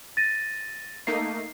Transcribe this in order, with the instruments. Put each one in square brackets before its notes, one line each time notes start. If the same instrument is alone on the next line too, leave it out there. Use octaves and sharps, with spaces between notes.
[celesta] A6 A#6 D#7
[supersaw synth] A3 A#3 D#4 [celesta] C7